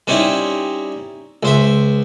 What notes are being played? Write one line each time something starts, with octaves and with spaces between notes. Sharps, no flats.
G3 C4 C#4 D#4 E4
C#2 C5 E5